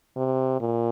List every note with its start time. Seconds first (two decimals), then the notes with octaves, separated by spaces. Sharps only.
0.16 C3
0.60 A#2